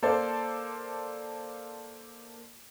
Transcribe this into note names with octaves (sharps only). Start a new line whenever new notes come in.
A#3 A4 C5 D5 A5